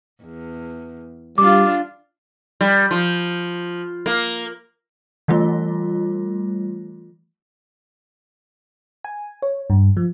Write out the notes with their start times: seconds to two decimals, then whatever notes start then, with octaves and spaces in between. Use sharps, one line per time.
0.23 E2
1.38 G3 D4 F4 D6
2.61 G3
2.91 F3
4.06 A#3
5.28 E3 G3 A3 F4
9.04 G#5
9.42 C#5
9.70 G2
9.97 F3